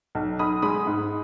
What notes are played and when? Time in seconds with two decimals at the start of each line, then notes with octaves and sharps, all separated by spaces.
0.15 B1
0.39 B1 B5 D#6
0.62 G#3 B5 D#6
0.87 G#2